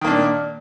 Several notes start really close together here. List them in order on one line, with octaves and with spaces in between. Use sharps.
D#3 A#3 D4 A#2